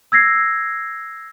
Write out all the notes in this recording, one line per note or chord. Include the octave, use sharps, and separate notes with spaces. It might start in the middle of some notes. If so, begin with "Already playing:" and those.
E6 G#6 A#6 C7